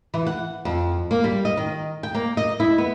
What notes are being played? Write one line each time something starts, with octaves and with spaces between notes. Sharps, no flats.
E3
F#5
F2
A#3
G3
D#5
D#3
G5
A#3
D#5
E4
B3